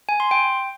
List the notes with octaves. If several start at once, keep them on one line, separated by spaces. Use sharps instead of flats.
G#5
C6
G5